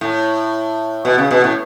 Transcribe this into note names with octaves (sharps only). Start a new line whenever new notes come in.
A2
B2
C#3
B2
A2